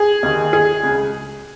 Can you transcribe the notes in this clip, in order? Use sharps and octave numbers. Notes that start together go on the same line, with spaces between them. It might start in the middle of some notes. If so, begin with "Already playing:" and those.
Already playing: G#4
D#2 D#3
G#4
C#2 C#3